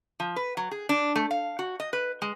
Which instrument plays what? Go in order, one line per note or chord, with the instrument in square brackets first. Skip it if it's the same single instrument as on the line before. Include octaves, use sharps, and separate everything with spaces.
[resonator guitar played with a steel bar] F3
B4
F#3
G#4
D4
A3
F5
F#4
D#5
B4
G#3